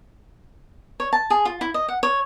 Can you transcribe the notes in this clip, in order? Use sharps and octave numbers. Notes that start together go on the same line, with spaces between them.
C#5
A5
G#4
F4
E4
D#5
F#5
C#5